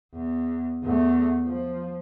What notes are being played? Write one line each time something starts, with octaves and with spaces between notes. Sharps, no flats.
E2
E2 A3
F3